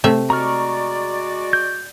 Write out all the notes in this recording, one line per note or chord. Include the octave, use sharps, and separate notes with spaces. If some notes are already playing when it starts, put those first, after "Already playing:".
C3 A3 E5
G#3 F#4 D5 A#5 C#6 F6
G6